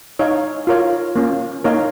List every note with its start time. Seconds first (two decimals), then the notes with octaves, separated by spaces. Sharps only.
0.19 D#4 C#5 F5
0.67 F4 A#4 C#5 F5
1.16 A#3 C#4 F4
1.64 A#3 D#4 A#4 C#5 F5